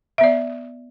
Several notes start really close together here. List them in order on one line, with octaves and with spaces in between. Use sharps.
E5 B3 D5